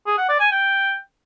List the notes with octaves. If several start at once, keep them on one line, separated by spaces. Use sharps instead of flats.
G#4
F#5
D5
G#5
G5